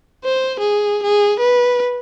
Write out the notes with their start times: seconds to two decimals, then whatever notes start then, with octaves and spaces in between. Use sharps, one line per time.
0.24 C5
0.60 G#4
1.03 G#4
1.40 B4